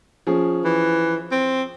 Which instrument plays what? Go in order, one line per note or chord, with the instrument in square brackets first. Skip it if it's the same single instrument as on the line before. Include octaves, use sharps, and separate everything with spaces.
[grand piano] F3 C#4 G#4
[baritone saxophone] E3
C4